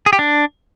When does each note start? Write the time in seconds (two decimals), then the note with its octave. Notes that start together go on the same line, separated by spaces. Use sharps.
0.06 G#4
0.13 G4
0.19 D4